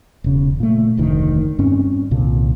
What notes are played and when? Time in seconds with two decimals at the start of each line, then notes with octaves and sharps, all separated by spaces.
0.24 E1 C#3
0.60 A#2 A3
0.97 F1 D2 D#3
1.59 G2 C4 C#4
2.11 C2 A#2 D3